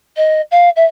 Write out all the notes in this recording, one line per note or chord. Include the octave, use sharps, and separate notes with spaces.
D#5
F5
E5